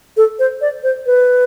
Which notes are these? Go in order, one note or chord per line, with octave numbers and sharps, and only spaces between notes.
A4
C5
D5
C5
B4